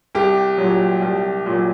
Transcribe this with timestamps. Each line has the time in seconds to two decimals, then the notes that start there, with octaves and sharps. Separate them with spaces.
0.15 C2 G4
0.58 A#2 F#3
1.02 C2
1.46 A#2 F#3